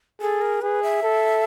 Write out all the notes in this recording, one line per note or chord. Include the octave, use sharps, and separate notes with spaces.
G#4 A4
A#4
G#4 B4
E5
A4